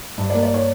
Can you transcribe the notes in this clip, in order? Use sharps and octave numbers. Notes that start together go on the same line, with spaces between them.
G2
D5
A#3
D5
C#5